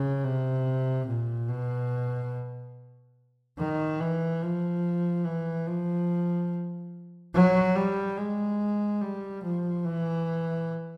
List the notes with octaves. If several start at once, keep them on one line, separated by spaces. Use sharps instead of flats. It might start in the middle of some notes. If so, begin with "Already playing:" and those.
Already playing: C#3
C3
A#2
B2
D#3
E3
F3
E3
F3
F#3
G3
G#3
G3
F3
E3